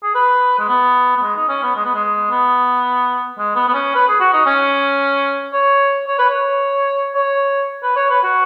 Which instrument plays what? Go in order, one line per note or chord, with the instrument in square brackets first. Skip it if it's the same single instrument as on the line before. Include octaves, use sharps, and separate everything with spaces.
[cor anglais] G#4
B4
G#3
B3
B3
G#3
D#4
C#4
B3
G#3
B3
G#3
B3
G#3
B3
B3
C#4
B4
G#4
F#4
D#4
C#4
C#5
C#5
B4
C#5
C#5
B4
C#5
B4
F#4